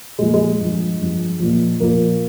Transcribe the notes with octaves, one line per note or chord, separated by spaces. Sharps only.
A#2 F3 G#3
G#3
G2 F3
G2 F3
A#2 F3
A#2 F3 A#3